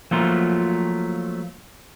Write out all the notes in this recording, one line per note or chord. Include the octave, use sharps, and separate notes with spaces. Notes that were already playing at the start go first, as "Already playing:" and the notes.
F3 F#3 A3 A#3 F4